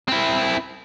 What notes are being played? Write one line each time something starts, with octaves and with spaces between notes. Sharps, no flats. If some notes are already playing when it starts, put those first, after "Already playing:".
C4 E4